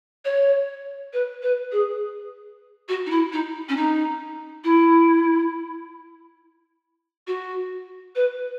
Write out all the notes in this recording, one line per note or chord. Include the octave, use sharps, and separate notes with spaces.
C#5
B4
B4
G#4
F#4
D#4
E4
D#4
C#4
D#4
E4
F#4
B4